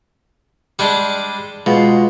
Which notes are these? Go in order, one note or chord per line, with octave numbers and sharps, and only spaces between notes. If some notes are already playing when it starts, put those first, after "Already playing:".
G3 G#3 D4
B2 G#3 F4